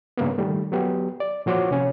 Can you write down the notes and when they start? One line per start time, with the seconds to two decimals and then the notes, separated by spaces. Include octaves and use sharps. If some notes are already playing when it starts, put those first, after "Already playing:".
0.17 G2 C#3 A#3 B3
0.38 D#3 G3 A3
0.72 F#3 B3 G4
1.20 D5
1.46 A#2 F3 F#4 C5 C#5 D6
1.71 C3 C#4